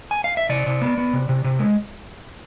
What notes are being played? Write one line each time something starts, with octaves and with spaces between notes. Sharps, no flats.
G#5
F5
E5
C3 D5
C3
B3
B3
C3
C3
C3
G#3